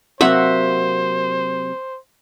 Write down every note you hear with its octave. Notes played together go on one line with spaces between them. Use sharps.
C3 F#3 A#3 C5 E5 F#5